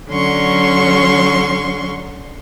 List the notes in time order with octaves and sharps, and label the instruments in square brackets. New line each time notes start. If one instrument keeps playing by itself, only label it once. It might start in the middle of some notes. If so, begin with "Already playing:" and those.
[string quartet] D3 F#3 C#4 C6 C#6